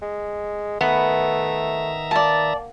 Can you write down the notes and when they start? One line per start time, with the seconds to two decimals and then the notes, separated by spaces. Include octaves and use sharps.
0.02 G#3
0.81 D#3 A3 B3 E5 A#5
2.11 A#3 D5 A5